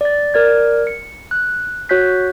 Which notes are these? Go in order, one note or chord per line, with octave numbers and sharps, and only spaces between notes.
D5 A6
A#4 D5 G#6
C#7
F#6
F#4 C#5 F#6 G6 B6